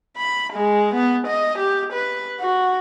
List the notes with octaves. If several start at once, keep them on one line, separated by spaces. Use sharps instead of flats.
B5
G#3
B3
D#5
G4
B4
F#4